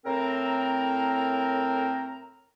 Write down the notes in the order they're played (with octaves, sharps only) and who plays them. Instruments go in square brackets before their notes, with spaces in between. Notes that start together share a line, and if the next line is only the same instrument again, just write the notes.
[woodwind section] A2 C4 A#4 A#5